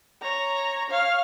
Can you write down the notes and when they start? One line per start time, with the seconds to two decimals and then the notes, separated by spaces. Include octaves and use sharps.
0.22 C#5 A#5
0.90 C#5 F5